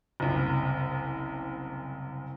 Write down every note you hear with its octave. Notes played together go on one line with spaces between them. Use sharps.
F#1 C2